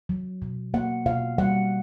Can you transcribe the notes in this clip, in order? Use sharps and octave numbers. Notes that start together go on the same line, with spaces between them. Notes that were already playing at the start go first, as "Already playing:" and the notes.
F#3
B2
A#3 F#5
B2 F5
G3 F#5